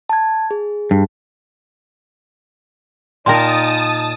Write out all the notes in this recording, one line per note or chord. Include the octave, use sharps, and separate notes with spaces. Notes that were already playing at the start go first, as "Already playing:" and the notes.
A5 G#6
G#4
G2
A#2 D#4 A#4 G5 A5 C6 D#6